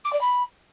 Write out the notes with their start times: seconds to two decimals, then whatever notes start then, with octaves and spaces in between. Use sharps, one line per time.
0.04 D6
0.12 D5
0.21 B5